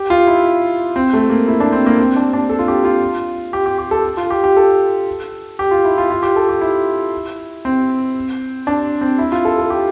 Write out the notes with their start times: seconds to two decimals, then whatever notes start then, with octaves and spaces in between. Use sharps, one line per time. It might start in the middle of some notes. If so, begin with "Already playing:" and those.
Already playing: G4
0.10 F4
0.27 E4
0.96 C4
1.13 A3
1.30 A#3
1.48 E4
1.60 D4
1.72 C4
1.86 A#3
1.98 C4
2.16 D4
2.33 D4
2.50 A4
2.59 F4
2.68 G4
2.85 F4
3.53 G4
3.66 G4
3.78 G4
3.91 A4
4.17 F4
4.30 G4
4.44 G4
4.57 A4
5.59 G4
5.71 F4
5.85 E4
5.98 F4
6.11 F4
6.23 G4
6.36 A4
6.49 G4
6.61 E4
7.65 C4
8.67 D4
9.01 C4
9.19 E4
9.32 F4
9.45 A4
9.58 A4
9.70 G4